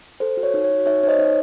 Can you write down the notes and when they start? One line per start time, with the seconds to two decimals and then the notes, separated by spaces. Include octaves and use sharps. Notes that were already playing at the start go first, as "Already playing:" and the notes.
0.20 A4 C5
0.37 F#4
0.43 C#5
0.54 D#4
0.64 C#5
0.70 F#4
0.86 D#4 C#5 E5
1.03 D#4 C#5
1.08 C5 D#5
1.19 D#4